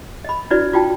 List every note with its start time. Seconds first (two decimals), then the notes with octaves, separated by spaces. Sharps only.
0.25 D#5 B5
0.51 D4 E4 F#4 B4 D5
0.73 F4 F#4 G5 A5